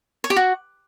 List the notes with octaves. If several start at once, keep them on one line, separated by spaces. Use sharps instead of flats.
C#5
G4
F#4